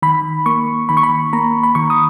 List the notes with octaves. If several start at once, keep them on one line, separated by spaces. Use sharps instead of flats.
D#3 B5
A#3 C#6
D#3 B5
C#6
B5
A#3 A#5
B5
D#3 C#6
D#6